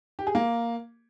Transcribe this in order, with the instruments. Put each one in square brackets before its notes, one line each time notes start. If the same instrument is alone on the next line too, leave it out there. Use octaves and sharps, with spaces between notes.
[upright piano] G4
G#4
A#3